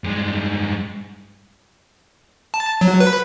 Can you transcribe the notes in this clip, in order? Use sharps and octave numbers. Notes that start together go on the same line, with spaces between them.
G2 G#3
A5
F#3
B4